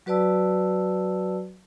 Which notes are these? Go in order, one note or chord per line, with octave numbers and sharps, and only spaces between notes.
F#3 F#4 B4 D5 A5 E6